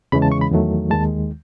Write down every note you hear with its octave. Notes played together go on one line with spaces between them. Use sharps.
E2 C#3 E3 G#3 B5
A5
C#6
B5
E2 D#3 F#3 A3
D#2 D#3 G#3 A5